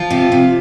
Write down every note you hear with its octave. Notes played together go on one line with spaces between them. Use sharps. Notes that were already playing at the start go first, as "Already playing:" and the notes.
Already playing: F3 F4
C3
C3